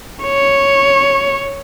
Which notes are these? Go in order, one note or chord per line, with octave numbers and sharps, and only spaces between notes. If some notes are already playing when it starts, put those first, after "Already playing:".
C#5